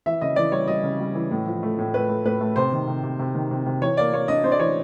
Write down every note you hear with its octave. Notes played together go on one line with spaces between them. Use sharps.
E3 E5
C#3 D#5
E3 D5
G3 C#5
G3 D#5
C#3
G3
E3
A2
F3
A3
A2
A3 B4
A3
A2 B4
A3
C3 C5
D#3
C3
C3
C3
D#3
C3
C3
E3 C#5
A#3 D5
A#3 C#5
D4 D#5
D4 C5
D5
E3 C#5